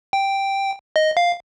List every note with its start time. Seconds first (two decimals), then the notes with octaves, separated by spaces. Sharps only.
0.13 G5
0.96 D#5
1.17 F5